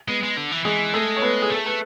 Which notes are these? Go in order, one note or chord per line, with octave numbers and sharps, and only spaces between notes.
G#3 B3
G#3
D3
E3
E3 G#3 G#4
G#3 A3 A4
C#5
B3 B4
G#4
A3 A4
B4